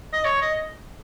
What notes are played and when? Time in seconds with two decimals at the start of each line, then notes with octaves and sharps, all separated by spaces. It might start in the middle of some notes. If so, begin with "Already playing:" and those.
0.13 D#5
0.24 C#5
0.41 D#5